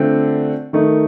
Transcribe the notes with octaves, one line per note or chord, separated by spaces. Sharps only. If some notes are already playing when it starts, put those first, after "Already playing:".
Already playing: D3 A3 C4 F4
D#3 A3 D#4